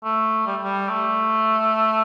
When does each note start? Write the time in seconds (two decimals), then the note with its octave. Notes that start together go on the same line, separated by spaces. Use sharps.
0.04 A3
0.47 G3
0.64 G3
0.89 A3